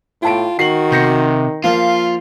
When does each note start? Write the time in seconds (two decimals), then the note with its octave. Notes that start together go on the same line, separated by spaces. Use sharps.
0.23 A2 F4 G5 A5 D7
0.59 D#3 F#4 C7 F#7
0.92 C3 G6 A#6 C#7
1.64 F3 A#3 F4 F5